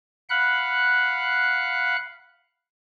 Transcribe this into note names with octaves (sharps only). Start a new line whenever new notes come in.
F5 F#5 B5 F#6